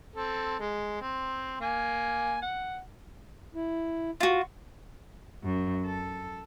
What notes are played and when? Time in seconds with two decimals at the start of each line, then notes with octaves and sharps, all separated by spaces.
0.16 C4 A4
0.60 G#3
1.01 C4
1.60 A#3 G#5
2.42 F#5
3.55 E4
4.20 F4 F#4
5.44 F#2
5.85 A4